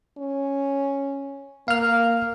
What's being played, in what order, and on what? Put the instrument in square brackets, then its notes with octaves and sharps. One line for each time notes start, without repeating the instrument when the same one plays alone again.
[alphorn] C#4
[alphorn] A#3 [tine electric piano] F5 F6